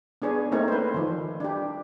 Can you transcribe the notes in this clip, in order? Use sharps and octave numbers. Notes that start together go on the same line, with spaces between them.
B3 D4 G#4 C#5
A3 A#3 C4 D#4 A#4 C#5
B4 C5
D#3 F3
D4 G4